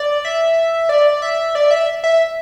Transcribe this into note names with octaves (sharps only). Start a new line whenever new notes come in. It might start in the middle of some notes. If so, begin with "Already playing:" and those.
Already playing: D5
E5
D5
E5
D5
E5
E5